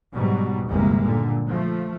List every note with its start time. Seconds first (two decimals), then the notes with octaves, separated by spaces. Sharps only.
0.14 G#2 B2 F#3 G3
0.68 G1 D#2 C3 E3 G#3 A#3
1.04 A#2 D3
1.47 F3 A3